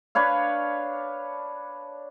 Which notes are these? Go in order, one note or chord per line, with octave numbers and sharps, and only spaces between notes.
D4 B4 C#5 F5